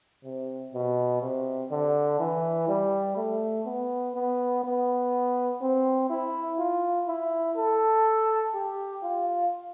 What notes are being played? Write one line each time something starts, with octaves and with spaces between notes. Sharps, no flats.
C3
B2
C3
D3
E3
G3
A3
B3
B3
B3
C4
E4
F4
E4
A4
G4
F4